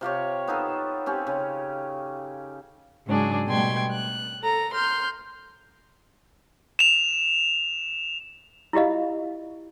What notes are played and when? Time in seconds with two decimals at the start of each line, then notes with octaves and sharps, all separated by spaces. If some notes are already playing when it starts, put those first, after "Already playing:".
0.01 C3 F4 G4 C#5
0.47 B3 D#4 F4 A4
1.06 C4 C#4 G4
1.27 C#3
3.07 G#2 C#3 F#3 D4 G#4
3.47 B2 G3 A3 G5 C6 G#6
3.91 F#6
4.41 A4 A#5
4.73 C6 F6 G6
6.79 E7 F7
8.73 E4 F4 G4 D#5 F5